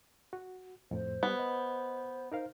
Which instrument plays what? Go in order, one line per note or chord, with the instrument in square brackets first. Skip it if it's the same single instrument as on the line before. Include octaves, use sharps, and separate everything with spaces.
[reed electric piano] F#4
[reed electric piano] F2 A2 [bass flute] C5
[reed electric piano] G3 [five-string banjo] B3
[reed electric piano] D#5
[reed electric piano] D#4 A#4 F5 [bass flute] C5